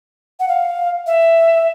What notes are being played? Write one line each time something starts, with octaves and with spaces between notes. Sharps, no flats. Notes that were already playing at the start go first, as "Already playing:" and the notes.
F#5
F5
E5